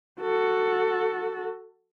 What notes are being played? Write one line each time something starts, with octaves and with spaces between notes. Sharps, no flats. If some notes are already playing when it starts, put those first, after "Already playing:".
F#4 A4